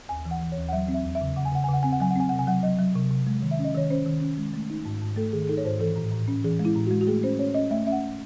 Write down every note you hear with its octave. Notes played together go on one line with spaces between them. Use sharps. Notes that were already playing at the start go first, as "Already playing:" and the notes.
D#2 G#5
E3
F#5
E3
C#5
D#2
F#5
F#3 E5
C4
E5
E2
E5
C#3
C#3 F#5
G#5
C#3 F#5
G#5
C#3
F#5
C4 G#5
F#5
F#3 G#5
F#5
C4 G#5
C3 F#5
G#5
F#3 F#5
F#3 D#5
F#3
C3
C3
G#3
D#3
E5
C#4
D#5
D#3 C#5
C#4 C5
D#3
C#4
G#3
A3
D#4
G#2
G#2
A3 A4
D#3 G#4
G#4
D#4 A4
C#5
G#2 C5
E3 A4
A2
A2
C#4
E3 G#4
G#3
E4
A2
G#3 F#4
F#4
A3 G#4
C#4 C5
C#4 C#5
C#4 D#5
A3 E5
C#4 E5
F#5